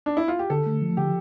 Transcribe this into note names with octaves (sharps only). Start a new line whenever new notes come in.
D4
E4
F4
G4
D3 A4
A3
F3
D3 G4